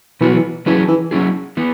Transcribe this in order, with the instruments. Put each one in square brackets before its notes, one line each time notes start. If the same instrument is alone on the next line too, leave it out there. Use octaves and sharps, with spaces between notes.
[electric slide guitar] B2 F#3 B3 F#4 [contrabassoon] E3
[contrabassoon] E3
[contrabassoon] E3 [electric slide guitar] F#3 C#4 E4 G#4
[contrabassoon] E3
[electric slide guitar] F#3 C#4 E4 G#4
E3 B3